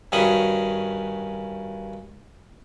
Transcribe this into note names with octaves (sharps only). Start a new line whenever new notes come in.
G2 D#3 C#4 F#4 B5 D#6